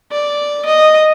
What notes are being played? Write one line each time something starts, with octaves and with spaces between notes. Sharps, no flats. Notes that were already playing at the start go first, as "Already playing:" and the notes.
D5
D#5